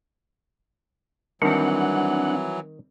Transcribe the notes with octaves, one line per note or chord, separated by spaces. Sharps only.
D#3 E3 F#3 G3 C4 D4 F#5